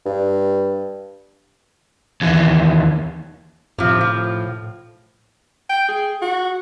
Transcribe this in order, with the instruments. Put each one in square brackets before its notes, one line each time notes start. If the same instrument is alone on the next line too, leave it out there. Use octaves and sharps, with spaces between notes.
[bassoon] G2
[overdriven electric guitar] D#2 E3
[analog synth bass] A2 [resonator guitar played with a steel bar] C3 F3
[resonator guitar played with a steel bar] F3
[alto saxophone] G5
G#4
F#4